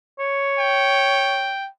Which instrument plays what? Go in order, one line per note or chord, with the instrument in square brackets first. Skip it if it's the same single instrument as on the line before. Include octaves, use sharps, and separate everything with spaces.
[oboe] C#5
[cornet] G5